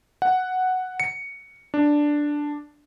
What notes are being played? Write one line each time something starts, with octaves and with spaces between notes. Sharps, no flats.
F#5
C#7
D4